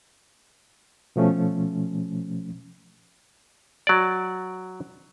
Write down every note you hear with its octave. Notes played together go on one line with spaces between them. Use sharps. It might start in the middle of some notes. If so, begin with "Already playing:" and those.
B2 F3 A3 C#4
F#3 D5